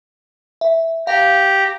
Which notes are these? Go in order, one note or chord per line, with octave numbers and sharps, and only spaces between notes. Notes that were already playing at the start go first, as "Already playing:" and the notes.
E5
G4 F5 A#5